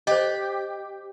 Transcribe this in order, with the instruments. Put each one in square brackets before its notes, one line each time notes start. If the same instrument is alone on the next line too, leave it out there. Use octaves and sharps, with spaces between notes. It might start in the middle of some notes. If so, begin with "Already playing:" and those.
[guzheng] G4 [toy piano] C5 D#5